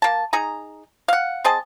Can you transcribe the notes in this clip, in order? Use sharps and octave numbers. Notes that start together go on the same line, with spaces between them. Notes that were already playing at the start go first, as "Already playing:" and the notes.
A#3 A5
D#4 G#4 A#5
F5 F#5
C4 G#4 D#5 A5